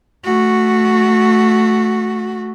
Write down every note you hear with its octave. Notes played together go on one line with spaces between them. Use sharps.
A3 F#4